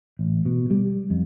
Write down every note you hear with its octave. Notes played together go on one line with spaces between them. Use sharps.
A1
B2
G3
F2